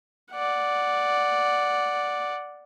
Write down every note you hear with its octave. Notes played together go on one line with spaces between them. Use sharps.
D5 F#5